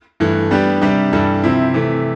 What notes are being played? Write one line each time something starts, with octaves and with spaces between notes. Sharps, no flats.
G2 E3 A3
G3 B3 D4 G4
C3 G3 D4 G4
G2 E3 G3 D4 A4
C3 F3 C4 E4
C3 E3 A3